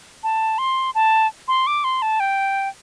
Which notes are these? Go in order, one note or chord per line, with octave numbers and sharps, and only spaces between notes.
A5
C6
A5
C6
D6
C6
A5
G5